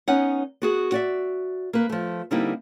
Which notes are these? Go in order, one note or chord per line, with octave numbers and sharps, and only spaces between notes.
B3 C#4 D#4 C#5 F#5
B3 F#4 G#4
F#4 D5 E5
A#3 B4
F3 A3
D3 G3 A#3 C4 D#4 E4